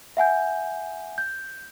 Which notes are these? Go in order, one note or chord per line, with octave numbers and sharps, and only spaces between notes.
E5 F#5 G#5 G6
G6